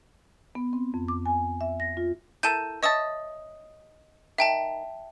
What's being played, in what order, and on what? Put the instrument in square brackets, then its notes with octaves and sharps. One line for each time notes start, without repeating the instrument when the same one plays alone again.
[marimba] B3
C4
F2
D6
G#5
E5
A#6
F4
[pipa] E4 A4 A#4 [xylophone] G6 D#7 E7
[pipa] C#5 E5 A5 [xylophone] D#5 D#6
[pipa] D#3 [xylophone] E5 G5 A5